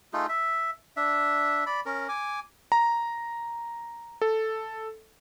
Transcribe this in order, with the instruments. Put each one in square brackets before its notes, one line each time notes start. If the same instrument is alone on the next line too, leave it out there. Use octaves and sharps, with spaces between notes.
[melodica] A3 D#4 F4 G#4
E5
D4 E5
D5 B5
C#4 A#4
G#5 D6
[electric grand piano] A#5
A4